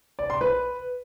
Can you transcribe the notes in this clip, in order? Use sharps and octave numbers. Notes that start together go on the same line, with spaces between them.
D5
C6
B4